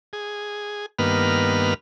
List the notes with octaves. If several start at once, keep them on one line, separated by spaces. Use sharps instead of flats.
G#4
G2 D#3 A#3 B3 B4 F6